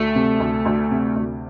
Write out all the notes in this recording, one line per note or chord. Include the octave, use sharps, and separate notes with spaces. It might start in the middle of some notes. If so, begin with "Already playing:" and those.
Already playing: D2 A3
C3
D2
D2
C3
D2